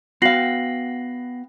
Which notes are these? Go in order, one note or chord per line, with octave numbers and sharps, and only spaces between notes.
B3 F#4 F5 G5 A#6 C7 F#7